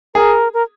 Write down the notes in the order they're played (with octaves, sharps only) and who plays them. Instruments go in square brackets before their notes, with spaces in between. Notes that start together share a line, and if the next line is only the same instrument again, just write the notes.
[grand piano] G#4 [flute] A#4
[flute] A#4